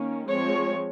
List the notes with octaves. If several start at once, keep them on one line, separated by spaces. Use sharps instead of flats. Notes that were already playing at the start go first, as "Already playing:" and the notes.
Already playing: D#3 A#3 C#4
F3 G#3 C4 C#5